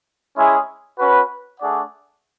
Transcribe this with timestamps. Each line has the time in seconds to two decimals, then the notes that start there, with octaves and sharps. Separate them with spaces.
0.37 G#3 C#4 E4 G#4
0.99 C#4 F#4 B4
1.60 A3 D4 G#4 D5 F#5